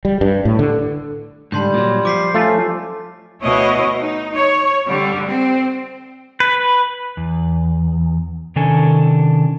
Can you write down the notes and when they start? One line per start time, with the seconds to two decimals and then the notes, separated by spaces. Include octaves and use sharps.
0.05 G3
0.21 G2
0.45 A2
0.59 D3
1.52 G#2 D3 G3 A5 C6 G6
1.74 A#2 F#3
2.05 F3 D6 B6 C7
2.34 A3 C#4 F4 A4
3.41 D2 B2 E4 C#5 D#5
3.99 D#4
4.35 C#5
4.86 D3 G3
5.26 C4
6.40 B4
7.17 E2
8.56 C3 D#3 C#4 D4 A4 G#5